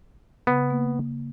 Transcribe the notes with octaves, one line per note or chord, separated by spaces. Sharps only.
C#3 B3
A#3